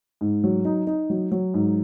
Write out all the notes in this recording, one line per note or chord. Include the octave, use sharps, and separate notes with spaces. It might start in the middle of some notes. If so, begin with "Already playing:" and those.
G#2
F#3
D#4
D#4
F#3
F#3
G#2